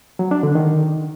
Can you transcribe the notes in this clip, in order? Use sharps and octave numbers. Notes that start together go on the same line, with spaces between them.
F#3
D4
D3
D#3